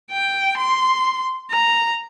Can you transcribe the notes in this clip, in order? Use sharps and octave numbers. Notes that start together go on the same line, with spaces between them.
G5
C6
A#5